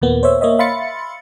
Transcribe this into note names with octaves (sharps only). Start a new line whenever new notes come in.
D#2 A#2 A#3 B3
C5 C#5 E5
A#3 C#5 D#5 E5
E5 F5 B5 C6 A6 C#7